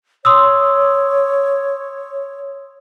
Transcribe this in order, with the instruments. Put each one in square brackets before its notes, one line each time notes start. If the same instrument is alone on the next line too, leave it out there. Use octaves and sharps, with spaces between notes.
[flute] C#5 [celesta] C6 D#6 E6